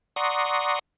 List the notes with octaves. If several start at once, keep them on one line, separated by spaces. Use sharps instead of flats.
D5 F#5 A#5 C6 C#6 D#6